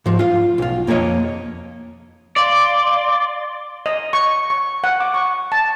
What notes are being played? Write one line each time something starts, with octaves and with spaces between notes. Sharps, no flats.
G#2 F3
F4 F5
B1 F4
F2 A#3 G#4 C#5 D#5
D5 F5 C6 D6
D#5
C#6
C#6
F#5
D6
C#6
A5